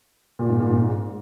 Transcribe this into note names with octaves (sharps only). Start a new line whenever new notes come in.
A#2
G#2
A#2
G#2